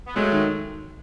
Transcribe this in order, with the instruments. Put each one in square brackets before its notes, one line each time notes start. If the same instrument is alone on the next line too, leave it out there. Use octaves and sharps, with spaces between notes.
[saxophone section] B3
[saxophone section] F#3 A3 [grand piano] G#3
[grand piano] D#3